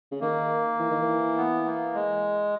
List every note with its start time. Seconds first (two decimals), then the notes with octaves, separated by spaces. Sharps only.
0.12 C#3
0.21 D#3 A#3
0.79 E3
0.91 D#3
1.02 E3
1.37 B3
1.65 A#3
1.94 G#3